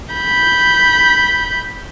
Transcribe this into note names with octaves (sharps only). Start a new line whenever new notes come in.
B5 G6